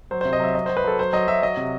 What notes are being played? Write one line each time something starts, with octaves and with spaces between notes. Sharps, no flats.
F#3 C5
C3 C5
D#5
F#3 E5
F#3 D#5
F#3 C5
B4
F#3 A4
F#3 C5
F#3 D#5
F#3 E5
F#3 D#5
C3